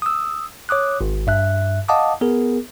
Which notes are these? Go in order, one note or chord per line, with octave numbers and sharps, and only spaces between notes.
D#6 E6
C#5 D6 D#6 F#6
G#1
G2 E5 F#6
D#5 F5 F#5 A5 D6 D#6
B3 G#4 A#4